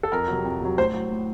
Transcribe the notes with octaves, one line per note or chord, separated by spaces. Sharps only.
A4
F2 A#4
C3 F#3
F2
C3 F#3
A2 C5
F#3
A2